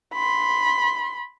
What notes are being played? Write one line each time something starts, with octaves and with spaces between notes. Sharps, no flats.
B5 C6